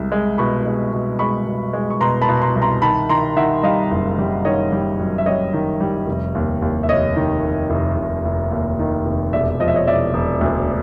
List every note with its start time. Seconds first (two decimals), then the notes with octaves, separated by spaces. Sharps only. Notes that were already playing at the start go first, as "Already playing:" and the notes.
Already playing: C2 G#3
0.12 G#3
0.38 B2 B5 C#6
0.66 G#3
0.93 B2
1.19 G#3 B5 C#6
1.46 B2
1.73 G#3
1.90 C#6
2.01 B2 A#5 C6
2.22 A5 B5
2.29 B2
2.42 A#5 C6
2.56 C2
2.62 A#5 C6
2.82 D#3 A5 B5
3.09 D#3 A#5 C6
3.36 D#3 E5 F#5
3.63 G3 D#5 F5
3.91 F#1
4.19 G3
4.45 D#3 C#5 D#5
4.72 G3
5.00 F#2
5.18 E5
5.26 G3 C#5 D#5
5.54 D#3
5.81 G3
6.07 F1
6.35 D#2
6.62 D#2
6.83 E5
6.88 F1 C#5 D#5
7.16 D#3
7.43 F1
7.70 F1
7.97 F1
8.25 F1
8.51 D#2
8.79 D#3
9.06 F1
9.33 E1 D5 E5
9.60 F3 D#5
9.68 E5
9.76 C#5 D#5
9.87 E1 D5 E5
10.14 E1
10.41 D2